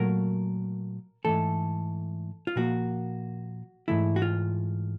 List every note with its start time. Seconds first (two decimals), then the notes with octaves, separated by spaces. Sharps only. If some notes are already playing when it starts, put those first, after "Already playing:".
Already playing: A#2 F#3 A3 A#4
1.25 G#2 E3 A3 A4
2.47 F4
2.56 A#2 F3 A#3 F#4
3.88 G#2 E3 A3 E4
4.16 F#4
4.22 F4